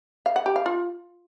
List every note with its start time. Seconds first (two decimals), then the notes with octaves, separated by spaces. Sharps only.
0.26 F5
0.36 F#5
0.46 G4
0.56 F5
0.66 F4